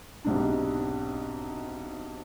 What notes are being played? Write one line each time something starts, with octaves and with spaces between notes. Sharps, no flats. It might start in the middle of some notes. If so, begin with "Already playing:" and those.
B1 G#2 C3 D4